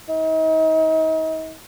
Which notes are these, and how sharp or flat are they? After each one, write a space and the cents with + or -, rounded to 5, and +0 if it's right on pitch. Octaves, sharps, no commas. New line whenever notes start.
D#4 +35